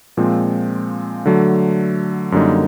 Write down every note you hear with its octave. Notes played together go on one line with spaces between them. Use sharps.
A#2 F3 G#3 C4
D3 F#3 A3
F#2 D3 G3 A#3 D#4